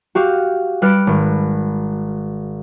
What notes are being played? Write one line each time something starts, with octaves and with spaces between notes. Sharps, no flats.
F#4 G4 F5
G3 B4 F6 F#6 C#7 D7
G#1